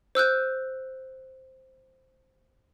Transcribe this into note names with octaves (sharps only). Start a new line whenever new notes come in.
C5 E6 F#6 G6